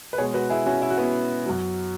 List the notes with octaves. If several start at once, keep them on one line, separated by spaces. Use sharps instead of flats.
B4
B2 G#3 G#4 C#5
F#4 B4
E4 G#4
C#4 F#4
E4
F#4
B3 E4
F#2 F#3